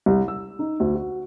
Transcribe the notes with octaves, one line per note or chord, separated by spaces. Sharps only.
C2
E6
D#4
D2
F#4